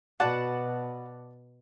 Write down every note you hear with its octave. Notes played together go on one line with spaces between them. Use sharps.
B2 F#4 B4 D5 F#5 A5